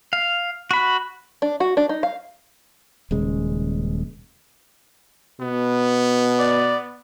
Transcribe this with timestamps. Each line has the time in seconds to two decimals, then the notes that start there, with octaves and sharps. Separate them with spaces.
0.13 F5
0.71 F#4 B5
1.42 D4
1.60 F#4
1.77 D4
1.89 D#4
2.03 F5
3.11 D#1 C#3 G#3
5.41 B2 B3
6.39 D5